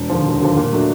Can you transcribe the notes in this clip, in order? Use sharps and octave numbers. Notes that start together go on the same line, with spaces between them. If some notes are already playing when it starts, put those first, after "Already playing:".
Already playing: E1
D#2 D3 F3
E1
D#2 D3 F3
A#2
F#3 A3 D4